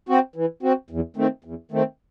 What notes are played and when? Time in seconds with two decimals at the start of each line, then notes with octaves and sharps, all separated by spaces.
0.09 C4 F#4
0.36 E3
0.63 C4 F#4
0.90 E2
1.16 D#3 A3 C4
1.44 E2
1.71 D#3 A3 C4